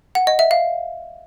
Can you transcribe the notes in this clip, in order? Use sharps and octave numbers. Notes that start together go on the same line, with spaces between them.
F#5
D#5
E5
F5